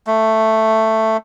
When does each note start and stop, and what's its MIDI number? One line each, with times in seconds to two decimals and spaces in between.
0.07 1.17 57